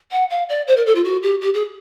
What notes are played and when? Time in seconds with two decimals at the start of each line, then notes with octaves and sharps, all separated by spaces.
0.11 F#5
0.30 F5
0.49 D5
0.67 C5
0.77 A#4
0.86 A4
0.95 F4
1.04 F#4
1.23 G4
1.41 G4
1.54 G#4